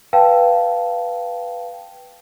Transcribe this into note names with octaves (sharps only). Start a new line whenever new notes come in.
B4 F5 G5 A5